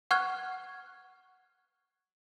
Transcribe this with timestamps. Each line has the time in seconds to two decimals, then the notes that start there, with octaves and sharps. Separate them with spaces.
0.11 F#5 C#6 F6 F#6 G#6